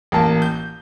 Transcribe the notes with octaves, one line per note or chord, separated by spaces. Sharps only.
A1 A#3 A5
G6